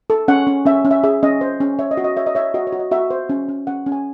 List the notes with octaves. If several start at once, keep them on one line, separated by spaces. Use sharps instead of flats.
A4
C#4 F#5
C#4
C#4 E5
C#4
E5
G#4 E5
C#4 D#5
C5
C#4
C#5 E5
D#5
F#4
D#5
C#5 E5
D#5
C#5 E5
F#4 D#5
C#5
F#4
D#5
F#4 E5
C5
C#4
C#4
C#4 F#5
C#4
G#5